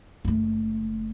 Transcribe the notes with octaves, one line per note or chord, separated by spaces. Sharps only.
F#1 A3